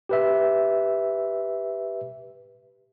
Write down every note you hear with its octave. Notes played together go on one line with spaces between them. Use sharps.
G4 B4 E5